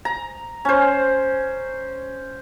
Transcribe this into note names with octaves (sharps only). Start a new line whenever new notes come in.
A#5
C#4 C5